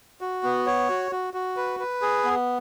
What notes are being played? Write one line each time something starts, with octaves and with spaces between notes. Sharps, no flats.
F#4
B3
C#5
F#4
F#4
F#4
B4
B4
G#4
B3